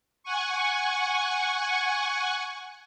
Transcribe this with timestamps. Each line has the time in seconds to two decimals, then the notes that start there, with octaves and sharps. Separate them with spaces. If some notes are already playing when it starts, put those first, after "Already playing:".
0.23 F#5 G#5 C#6